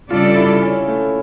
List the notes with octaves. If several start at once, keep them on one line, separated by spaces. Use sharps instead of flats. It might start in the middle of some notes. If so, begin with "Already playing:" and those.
C#3 G3 D4 F4 A4 D5
E4
C#4
A3